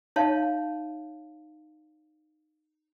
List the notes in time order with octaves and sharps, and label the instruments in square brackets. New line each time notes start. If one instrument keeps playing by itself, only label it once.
[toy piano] D#4 C#5 E5 F5 A5